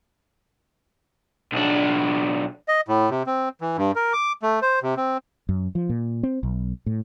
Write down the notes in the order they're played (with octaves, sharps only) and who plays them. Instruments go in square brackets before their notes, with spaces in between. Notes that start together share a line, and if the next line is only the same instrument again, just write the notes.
[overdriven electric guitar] B1 D4
[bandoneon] D#5
A2
C3
C4
E3
G2
A#4
D6
A3
C5
C3
C4
[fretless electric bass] F#2
F3
A#2
C4
B1
A2